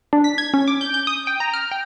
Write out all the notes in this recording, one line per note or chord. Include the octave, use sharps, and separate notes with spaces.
D4
B6
G#6
C#4
D6
G6
G6
D#6
G5
A#5
F6
G5